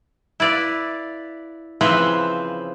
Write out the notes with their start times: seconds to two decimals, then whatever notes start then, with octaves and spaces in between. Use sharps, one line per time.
0.40 E4 B4 D5 F5
1.81 C#3 E3 F3 C4 B4